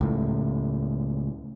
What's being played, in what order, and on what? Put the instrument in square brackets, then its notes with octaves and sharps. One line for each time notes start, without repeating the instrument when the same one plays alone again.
[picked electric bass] C#2 A2